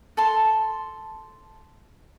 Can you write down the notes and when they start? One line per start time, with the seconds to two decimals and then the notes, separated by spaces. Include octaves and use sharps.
0.17 A4 A5 C6